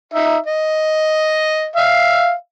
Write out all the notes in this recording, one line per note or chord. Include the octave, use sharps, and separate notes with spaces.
D#4 E5
D#5
E5 F5